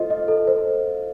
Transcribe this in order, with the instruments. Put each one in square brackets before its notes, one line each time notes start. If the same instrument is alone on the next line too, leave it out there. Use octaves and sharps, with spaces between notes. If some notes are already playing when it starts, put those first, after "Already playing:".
Already playing: [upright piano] F4 [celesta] A4 C5 D#5
[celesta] D#5
A4
C5